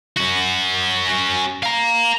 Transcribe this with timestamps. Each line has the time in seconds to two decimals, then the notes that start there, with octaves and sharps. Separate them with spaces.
0.17 C#4 F#4
1.63 F5 A#5